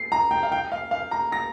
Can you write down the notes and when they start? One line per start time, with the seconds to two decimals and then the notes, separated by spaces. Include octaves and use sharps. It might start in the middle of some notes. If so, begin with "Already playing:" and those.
Already playing: C7
0.12 A#5
0.31 G5
0.43 F5
0.52 G5
0.72 F5
0.91 F5
1.11 A#5
1.32 A#6